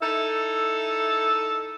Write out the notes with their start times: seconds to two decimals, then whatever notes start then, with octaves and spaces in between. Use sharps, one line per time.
0.01 D#4 E4 A4